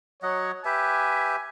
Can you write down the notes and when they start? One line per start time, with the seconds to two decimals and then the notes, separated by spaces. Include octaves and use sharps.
0.23 F#3 C#5 D#5 F#5
0.65 G4 B4 E5 G#5